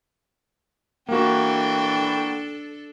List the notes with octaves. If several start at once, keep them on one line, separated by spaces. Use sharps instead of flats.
E3 A#3 D4 F#4 A4 G5